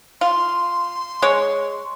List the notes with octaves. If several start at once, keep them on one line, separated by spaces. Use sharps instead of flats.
F4 C6
G#3 C#5